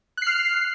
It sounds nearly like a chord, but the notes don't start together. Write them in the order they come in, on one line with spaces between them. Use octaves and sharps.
F#6 C7 F6